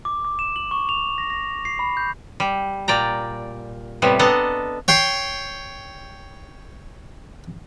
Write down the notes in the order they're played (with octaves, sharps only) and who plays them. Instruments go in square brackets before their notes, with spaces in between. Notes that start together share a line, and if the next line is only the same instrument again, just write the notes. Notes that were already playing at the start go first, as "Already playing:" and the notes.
[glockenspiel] D6
D6
E7
F#7
C#6
F7
A#6
A#6
C7
B5
G6
[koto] G3
A#2 D5 G5 A#5
A2 C3 G3 B3
B3 D4 A4 D#5 A5 A#5
[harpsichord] C#5 G5 C6